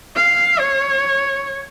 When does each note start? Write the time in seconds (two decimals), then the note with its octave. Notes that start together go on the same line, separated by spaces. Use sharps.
0.16 F5
0.59 C#5